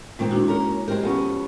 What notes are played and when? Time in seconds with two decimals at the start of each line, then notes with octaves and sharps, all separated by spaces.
0.19 A#2 D#3 G#3 C4
0.31 D4 E4 F#4
0.48 A#3 C#4 A#4 A#5
0.88 G#3 C4 G4 A#4
1.03 F2 B3 C#4